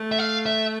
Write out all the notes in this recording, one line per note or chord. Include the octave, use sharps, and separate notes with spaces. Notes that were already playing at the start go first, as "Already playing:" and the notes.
Already playing: A3
E5
F5
E5